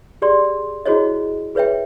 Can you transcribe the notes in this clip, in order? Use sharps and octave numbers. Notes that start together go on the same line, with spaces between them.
G4 G#4 D5 C6
E4 F#4 G#4 C5 C#5 D#5
G#4 B4 C#5 E5 G5